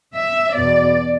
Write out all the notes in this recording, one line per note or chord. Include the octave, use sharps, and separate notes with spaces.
E5
E2 B2 D5